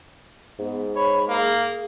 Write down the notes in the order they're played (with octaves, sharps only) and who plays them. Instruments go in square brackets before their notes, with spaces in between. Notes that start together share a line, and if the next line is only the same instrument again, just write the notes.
[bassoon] G#2 [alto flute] B3
[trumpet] C#5 [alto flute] B5
[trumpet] A#3 [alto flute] G#4